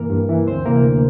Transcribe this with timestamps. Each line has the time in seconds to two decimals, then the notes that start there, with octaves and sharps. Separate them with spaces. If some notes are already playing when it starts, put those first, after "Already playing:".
Already playing: G2 E3 A#3 A#4
0.10 G2
0.29 E3
0.46 D2 C4 C5
0.65 C3 E3 A#3 A#4
0.83 D2